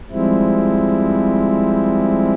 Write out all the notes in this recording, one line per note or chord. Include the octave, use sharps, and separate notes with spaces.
F3 G3 G#3 C4 E4